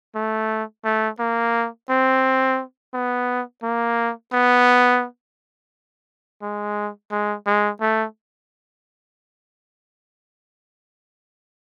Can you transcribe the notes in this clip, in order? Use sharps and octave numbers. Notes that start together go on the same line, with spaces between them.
A3
A3
A#3
C4
B3
A#3
B3
G#3
G#3
G#3
A3